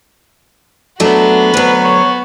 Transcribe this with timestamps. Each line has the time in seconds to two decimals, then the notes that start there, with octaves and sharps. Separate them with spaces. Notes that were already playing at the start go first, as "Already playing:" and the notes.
1.00 F#3 A3 B3 D4 F#4
1.54 D2 F#3 B4
1.84 C#5